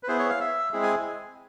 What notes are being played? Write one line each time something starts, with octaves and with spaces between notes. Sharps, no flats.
B4
B3 E4 G#4 C5
C#5
F5
E5
G#3 C4 E4 G#4
G#5